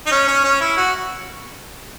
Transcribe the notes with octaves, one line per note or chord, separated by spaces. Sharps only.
D#4
C#4
C#4
C#4
E4
F#4